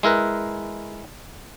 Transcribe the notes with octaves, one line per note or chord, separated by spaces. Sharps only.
G#3 E4 A#4 B4